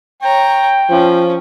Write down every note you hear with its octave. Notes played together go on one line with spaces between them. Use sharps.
C#5 G5 A#5
F3 C#4